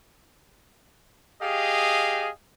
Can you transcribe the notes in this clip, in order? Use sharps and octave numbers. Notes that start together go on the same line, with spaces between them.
G4 G#4 D#5 F5